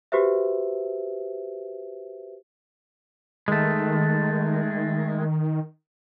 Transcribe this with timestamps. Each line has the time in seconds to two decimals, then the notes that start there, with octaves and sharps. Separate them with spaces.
0.12 F#4 G4 B4 C5 E5
3.48 D#3 G#3 A3